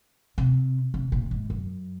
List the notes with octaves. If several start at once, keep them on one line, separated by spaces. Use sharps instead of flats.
C3
C3
A#2
G#2
F#2